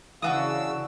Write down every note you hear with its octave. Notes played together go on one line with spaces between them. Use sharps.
C#3 E3 D4 F#4 F5 D#6 E6